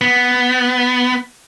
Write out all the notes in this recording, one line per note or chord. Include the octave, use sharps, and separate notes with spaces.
B3